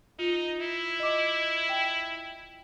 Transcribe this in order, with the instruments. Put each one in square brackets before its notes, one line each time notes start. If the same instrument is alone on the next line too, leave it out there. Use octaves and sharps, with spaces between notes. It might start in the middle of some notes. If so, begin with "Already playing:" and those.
[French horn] D#4 [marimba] F4
[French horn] E4
[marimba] D#5 D6
G5